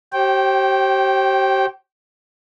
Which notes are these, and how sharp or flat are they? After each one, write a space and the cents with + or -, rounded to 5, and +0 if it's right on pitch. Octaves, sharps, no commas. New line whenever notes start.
G4 -35 C5 +40 G5 -10